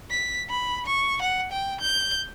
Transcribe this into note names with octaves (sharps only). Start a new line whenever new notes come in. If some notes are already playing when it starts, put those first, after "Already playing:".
B6
B5
C#6
F#5
G5
G6